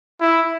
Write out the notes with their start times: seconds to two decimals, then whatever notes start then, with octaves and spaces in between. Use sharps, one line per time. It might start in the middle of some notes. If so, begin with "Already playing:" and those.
0.20 E4